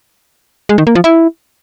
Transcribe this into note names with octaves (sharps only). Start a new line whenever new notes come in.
G#3
D#3
A#3
F3
E4